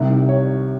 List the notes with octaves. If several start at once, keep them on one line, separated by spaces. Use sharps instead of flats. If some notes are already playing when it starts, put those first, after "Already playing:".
Already playing: C2 C3 D#3
C#5